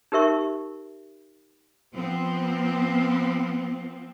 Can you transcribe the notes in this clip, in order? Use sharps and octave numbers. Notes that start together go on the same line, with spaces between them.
D#4 G4 A#4 E5 C#6
F3 B3 C4